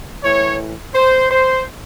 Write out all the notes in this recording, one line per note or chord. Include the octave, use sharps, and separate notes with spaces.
A2 E3 C#5
C5
C5